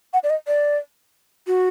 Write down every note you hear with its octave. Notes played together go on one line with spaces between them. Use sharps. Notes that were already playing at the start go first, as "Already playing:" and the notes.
F#5
D5
D#5
D5
F#4